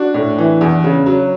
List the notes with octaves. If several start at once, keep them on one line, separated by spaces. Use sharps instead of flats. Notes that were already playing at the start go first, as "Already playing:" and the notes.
Already playing: D4 F#4
A2
E3
E2
C#3
F#3